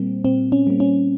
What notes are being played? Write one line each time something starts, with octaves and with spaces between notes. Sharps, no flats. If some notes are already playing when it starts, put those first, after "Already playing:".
Already playing: A#2 G3 A#3 C4
A#2 C4
C#4
G3 A#3
C#4